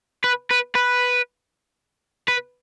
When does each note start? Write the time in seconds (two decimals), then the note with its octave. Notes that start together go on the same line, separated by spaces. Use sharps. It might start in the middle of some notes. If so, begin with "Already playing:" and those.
0.24 B4
0.51 B4
0.75 B4
2.28 B4